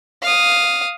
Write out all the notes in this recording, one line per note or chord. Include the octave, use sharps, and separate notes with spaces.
F5 D#6